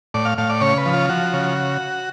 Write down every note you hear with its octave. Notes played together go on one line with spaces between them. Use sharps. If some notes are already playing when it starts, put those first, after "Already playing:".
A2 D5
F5
A2 F5
D5
C#3 C#5
B4
F3
F4
F3 F#4
C#3